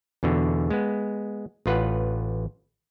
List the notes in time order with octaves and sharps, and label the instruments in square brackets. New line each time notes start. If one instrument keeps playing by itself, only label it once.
[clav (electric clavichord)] E2 B2 D3
G#3 B3
A1 F4 B4 F#5